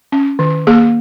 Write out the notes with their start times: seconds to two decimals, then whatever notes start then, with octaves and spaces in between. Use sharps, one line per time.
0.12 C#4
0.39 D#3
0.67 A#3 G#4